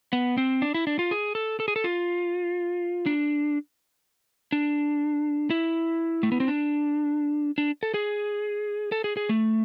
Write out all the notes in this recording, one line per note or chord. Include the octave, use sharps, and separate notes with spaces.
B3
C4
D4
E4
D4
F4
G#4
A4
A4
G#4
A4
F4
D4
D4
E4
A3
B3
C4
D4
D4
A4
G#4
A4
G#4
G#4
A3